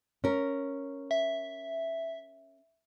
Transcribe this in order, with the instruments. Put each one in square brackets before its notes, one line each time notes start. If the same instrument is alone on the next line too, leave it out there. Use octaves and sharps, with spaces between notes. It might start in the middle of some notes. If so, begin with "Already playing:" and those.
[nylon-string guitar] C#4 A#4
[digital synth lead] E5